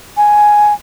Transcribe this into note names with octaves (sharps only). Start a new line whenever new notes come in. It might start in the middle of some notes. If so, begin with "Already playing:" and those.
G#5